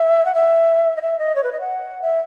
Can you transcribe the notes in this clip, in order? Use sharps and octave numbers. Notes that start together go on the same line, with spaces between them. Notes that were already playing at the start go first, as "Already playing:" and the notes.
Already playing: E5
F#5
E5
D#5
E5
D#5
C#5
B4
D#5
F#5
E5